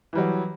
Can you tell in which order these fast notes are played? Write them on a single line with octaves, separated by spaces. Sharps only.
E3 G3 F#3